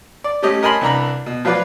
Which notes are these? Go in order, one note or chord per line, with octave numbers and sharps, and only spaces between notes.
D5
G3 A3 C#4 G4 D#5
A#4 D#5 G#5 A5 B5 C6
C2 E3 D4 A#5 B5
B2
F3 F#3 F4 B4 D5